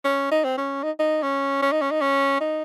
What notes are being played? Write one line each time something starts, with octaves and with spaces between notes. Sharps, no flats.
C#4
D#4
C4
C#4
D#4
D#4
C#4
C#4
D#4
C#4
D#4
C#4
D#4